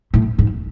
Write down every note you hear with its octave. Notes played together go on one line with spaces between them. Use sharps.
A2
G#2